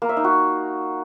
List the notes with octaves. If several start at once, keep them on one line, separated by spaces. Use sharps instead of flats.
A#3
E5
D#4
F#4